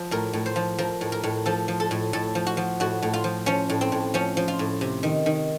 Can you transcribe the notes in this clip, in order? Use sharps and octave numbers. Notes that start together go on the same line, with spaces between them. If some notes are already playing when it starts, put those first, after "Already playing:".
Already playing: F3
A2 A#4
A2
C5
F3
F3 A#4
A2
A#4
A2
F3 A4
F3
A4
A2
A2 A4
F3
F#4
F3
A2 F#4
A2
F4
F3
F3 C#4
A2
C4
A2
F3 C#4
F3
F4
A2
C3
D#3
D#3